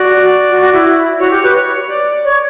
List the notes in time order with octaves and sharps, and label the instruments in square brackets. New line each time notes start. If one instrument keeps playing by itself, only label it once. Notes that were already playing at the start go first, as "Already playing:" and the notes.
Already playing: [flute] F#4 [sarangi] D5
[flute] F#4
F#4
E4
[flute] F#4 [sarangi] C#5
[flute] G4
B4
[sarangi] C#5
D5
[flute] C#5